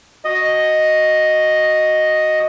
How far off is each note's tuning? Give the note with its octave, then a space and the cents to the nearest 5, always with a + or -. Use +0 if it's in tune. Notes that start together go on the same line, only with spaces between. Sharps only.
F#4 +0 D#5 +0